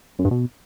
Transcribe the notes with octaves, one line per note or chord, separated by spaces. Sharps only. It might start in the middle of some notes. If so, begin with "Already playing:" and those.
F#2
G2
B2